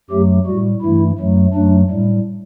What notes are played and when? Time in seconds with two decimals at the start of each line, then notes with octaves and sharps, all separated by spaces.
0.10 F#2 F#3 A3 G4
0.46 A2 G3 F#4
0.82 G2 E3 A3 E4
1.18 F#2 F#3 A3
1.54 F#2 F#3 A3 D4
1.91 A2 G3